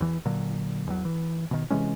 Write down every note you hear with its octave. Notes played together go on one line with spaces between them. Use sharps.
E2 E3
A#2 D3 F#3
E2 F#3
E3
B2 D#3
C3 E3 G#3 C#4